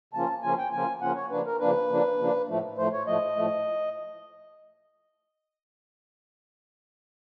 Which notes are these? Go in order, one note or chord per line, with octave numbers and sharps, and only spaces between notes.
C#3 F3 A#3 C#4 F4 A5
C#3 F3 A#3 C#4 F4 G#5
G5
C#3 F3 A#3 C#4 F4 G#5
C#3 F3 A#3 C#4 F4 F#5
C#5
C#3 F3 A#3 D4 B4
A#4
C#3 F3 A#3 D4 B4
C#3 F3 A#3 D4
C#3 F3 A#3 D4
A2 F3 A3
A2 F3 A3 C5
C#5
A2 F3 A3 D#5
A2 F3 A3